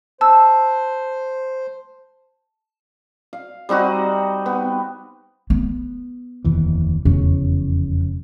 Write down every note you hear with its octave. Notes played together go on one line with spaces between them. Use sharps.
C5 A5 E6
F5
G3 C4 D#4 F#4
B3
B3
F1 D#2 E3
F1 E2 C#3 C#4